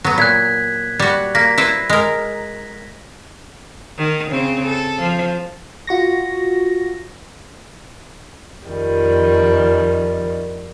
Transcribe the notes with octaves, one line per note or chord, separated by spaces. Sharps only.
F#3 B3
A#2 F#6 G#6 B6
G3 F#4
A#3 A#6 B6
E4 B4 C5
G#3 A#4
D#3
C#3 C4 C5
A4
F3
F4 F#4 C#6 A#6
F2 D#3 F3 G3